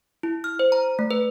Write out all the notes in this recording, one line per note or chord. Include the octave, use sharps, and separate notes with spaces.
E4
F6
C5
A#5
A3
B4